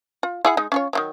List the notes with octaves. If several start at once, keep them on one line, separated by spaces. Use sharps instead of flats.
F4
E4 G#4 F#5
G#3 D#4
C#4 F4 C#5
D#3 E3 F#3